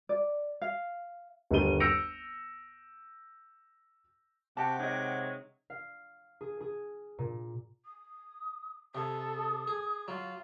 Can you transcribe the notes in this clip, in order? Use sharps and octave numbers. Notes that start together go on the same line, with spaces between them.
D5
F5
G1 D#2 G3 A#3 D#7 G7
E6 G6 A#6 C#7 D7 F7
C3 F#4 G4 F#5 G5 A5 D6
D#3 F#3 G#3 D#4 D#5
F5
G#4
G#4
A#2
D#6
C3 A4 D#6
G#4
F#3 F4 F5